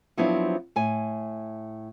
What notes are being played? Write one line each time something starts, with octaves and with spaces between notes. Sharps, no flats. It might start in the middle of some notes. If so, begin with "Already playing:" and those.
F3 F#3 B3 C4 D4 E4
A2 G#5